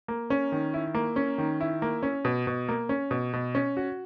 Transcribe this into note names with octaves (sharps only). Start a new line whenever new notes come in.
A#3
C#4
D#3
E4
A#3
C#4
D#3
E4
A#3
C#4
B2
B2
A#3
C#4
B2
B2
C#4
F#4